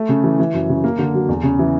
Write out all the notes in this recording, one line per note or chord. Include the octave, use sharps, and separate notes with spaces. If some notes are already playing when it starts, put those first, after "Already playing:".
Already playing: A3
C#3
E3
E3
F#2
C#3
A#3
D3
F#3
E2
C#3
E3